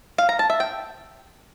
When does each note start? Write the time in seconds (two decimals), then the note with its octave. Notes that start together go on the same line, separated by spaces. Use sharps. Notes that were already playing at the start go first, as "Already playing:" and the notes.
0.18 F5
0.29 A#5
0.39 A5
0.50 E5
0.60 G5